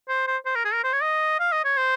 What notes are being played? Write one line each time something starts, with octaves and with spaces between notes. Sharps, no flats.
C5
C5
C5
A#4
G#4
A#4
C5
C#5
D#5
F5
D#5
C#5
C5